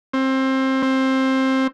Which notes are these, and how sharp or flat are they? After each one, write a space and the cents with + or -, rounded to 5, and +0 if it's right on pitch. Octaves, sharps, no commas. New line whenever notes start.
C4 +20
C4 +15